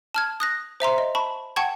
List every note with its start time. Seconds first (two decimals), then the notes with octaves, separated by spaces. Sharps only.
0.14 A5 F6 G#6
0.40 D#6 F#6 A#6
0.80 C5 E5 A#5 C6
0.98 D#5
1.15 A5 B5 C#6
1.56 F#5 G5 A5 C#6 G#6